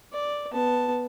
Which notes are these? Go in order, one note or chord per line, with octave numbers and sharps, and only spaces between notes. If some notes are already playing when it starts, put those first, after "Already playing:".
D5
B3 A5